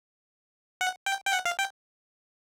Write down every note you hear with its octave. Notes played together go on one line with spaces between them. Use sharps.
F#5
G5
G5
F#5
F5
G5